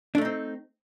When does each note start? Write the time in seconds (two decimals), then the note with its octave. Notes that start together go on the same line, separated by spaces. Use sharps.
0.15 D4
0.18 A3
0.21 D#4
0.25 C4